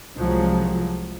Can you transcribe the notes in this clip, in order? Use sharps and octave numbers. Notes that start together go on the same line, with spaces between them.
C2 F3 F#3 G#3